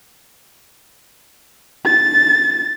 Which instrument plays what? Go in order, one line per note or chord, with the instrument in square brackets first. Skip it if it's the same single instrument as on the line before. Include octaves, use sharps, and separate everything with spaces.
[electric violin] A6